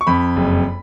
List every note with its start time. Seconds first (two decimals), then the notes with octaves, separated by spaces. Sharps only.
0.01 C#6
0.07 F2 B5
0.36 F#1